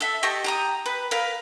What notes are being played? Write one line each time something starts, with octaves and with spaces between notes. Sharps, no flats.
A4 E5
G4 D#5 A5 C#6
G4 A#5 D#6
B4
A#4 B4 F5